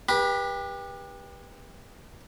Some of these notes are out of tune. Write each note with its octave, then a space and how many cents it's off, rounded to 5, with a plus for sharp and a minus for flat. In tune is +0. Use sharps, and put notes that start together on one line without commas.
G4 +25 B4 -25